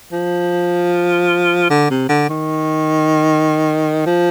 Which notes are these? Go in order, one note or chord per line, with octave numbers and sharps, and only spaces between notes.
F3
D3
C3
D3
D#3
F3